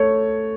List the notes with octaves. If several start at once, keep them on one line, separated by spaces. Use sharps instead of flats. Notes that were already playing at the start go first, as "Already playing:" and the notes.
Already playing: A3 C#5